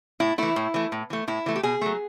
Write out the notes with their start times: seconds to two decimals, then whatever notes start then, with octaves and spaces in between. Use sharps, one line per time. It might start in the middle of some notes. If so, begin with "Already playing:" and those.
0.20 A2 E4
0.38 E3 A3 E4
0.56 A2
0.74 E3 A3
0.92 A2
1.10 E3 A3
1.28 A2 E4
1.46 E3 A3
1.56 G4
1.63 B2 G#4
1.81 F#3 A3